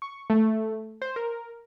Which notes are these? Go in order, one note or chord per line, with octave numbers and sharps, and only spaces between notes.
C#6
A3
C5
A#4